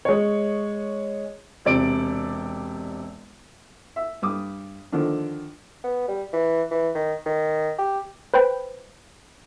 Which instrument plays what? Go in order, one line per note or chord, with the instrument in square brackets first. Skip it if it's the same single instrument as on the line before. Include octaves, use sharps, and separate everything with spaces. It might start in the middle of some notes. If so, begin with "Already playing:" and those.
[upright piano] G#3 C#5
[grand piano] E1 C3 D5 D7
[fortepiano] E5
G2 D6 D#6
D3 D#3 F3 D4
[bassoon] B3
G3
E3
E3
D#3
D#3
G4
[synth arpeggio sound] B4 C5 G5 B5